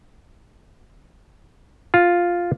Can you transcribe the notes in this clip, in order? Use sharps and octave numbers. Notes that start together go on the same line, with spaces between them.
F4